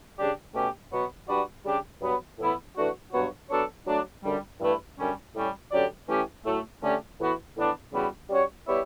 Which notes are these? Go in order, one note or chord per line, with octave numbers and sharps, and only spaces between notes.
C#3 G3 D4 G4 D5
B2 A3 C#4 G4
B2 F#3 B3 F#4 C#5
G3 D4 F#4 B4 D5
C#3 G3 D4 G4
G2 F#3 B3
A2 E3 B3 E4
E3 A3 D4 F#4
G2 F#3 B3 F#4 C#5
F#3 B3 D4 A4 C#5
F#3 A3 D4
F#2 D3 G3
G2 E3 A3 E4 B4
F#2 D3 G3 C#4
A2 G3 C#4
D3 F#3 C#4 G4 D5
E3 A3 C#4 G4
A2 F#3 A3
D3 A3 C#4 G4 D5
A2 E3 B3 F#4 B4
A2 E3 B3 D4
E2 C#3 G3 B3 F#4
G3 C#4 F#4 C#5
G3 B3 E4 G4 C#5